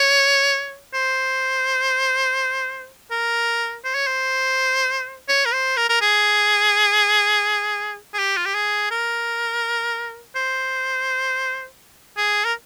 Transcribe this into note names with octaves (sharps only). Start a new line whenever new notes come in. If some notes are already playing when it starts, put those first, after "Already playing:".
Already playing: C#5
C5
A#4
C5
C#5
C5
C#5
A#4
C5
A#4
A#4
G#4
G#4
G4
F4
G4
G#4
A#4
C5
G#4
A#4